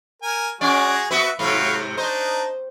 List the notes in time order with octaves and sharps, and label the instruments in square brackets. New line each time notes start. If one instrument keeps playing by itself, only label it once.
[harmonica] A#4 G#5
[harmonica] G#3 F#4 G#4 [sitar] C#4 D5
[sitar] B3 F#4 B4 [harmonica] E5
[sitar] G#2 C3 [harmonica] F#3 B4 F5
[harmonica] D4 D#4 [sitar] C5